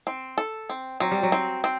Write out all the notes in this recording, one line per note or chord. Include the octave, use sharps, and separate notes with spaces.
C4
A4
C4
F#3 C4
G3
F#3
C4
C4